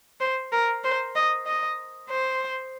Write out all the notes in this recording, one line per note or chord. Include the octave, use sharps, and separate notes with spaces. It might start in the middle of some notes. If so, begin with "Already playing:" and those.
C5
A#4
C5
D#5
D#5
C5